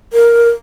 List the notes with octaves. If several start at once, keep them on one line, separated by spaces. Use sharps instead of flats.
A#4